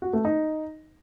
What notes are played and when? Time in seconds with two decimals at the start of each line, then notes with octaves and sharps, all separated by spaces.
0.02 F#4
0.13 A3
0.25 D#4